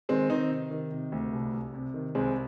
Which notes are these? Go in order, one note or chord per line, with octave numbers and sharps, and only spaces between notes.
D#3 G#3 C4
D#3 C4 D#4
C3
D#3
C3
D2
C2
C2
C3
D#3
C2 G#3 C4